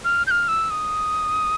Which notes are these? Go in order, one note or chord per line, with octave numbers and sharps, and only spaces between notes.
F6
G6
F6
E6
D#6